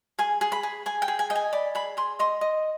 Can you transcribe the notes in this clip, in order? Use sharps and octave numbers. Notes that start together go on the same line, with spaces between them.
G#4 G#5
G#4
B5
G#4
G#4 G#5
G5
G#4
G#5
D#5 G5
G#5
D5 B5
G#4 B5
G#4 C6
D#5 C6
D#5